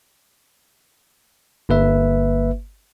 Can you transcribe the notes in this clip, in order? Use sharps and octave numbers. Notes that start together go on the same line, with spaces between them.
G1 A#3 B4 E5